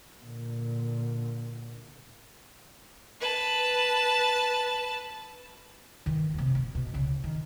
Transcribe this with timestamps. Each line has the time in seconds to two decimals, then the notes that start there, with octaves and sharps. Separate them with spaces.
0.20 A#2 D3
3.21 B4 A5
6.06 D#3 E3
6.34 F#2 C3
6.55 B2
6.75 B2
6.94 C#2 C#3
7.24 D#3